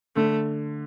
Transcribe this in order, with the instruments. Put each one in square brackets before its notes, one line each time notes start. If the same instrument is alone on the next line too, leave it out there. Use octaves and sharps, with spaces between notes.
[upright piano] D3 [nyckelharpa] A3